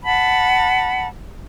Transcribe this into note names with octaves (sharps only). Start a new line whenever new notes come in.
F#5 A5 B5